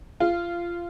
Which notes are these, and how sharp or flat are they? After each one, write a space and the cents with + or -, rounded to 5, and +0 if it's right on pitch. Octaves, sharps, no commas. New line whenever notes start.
F4 -20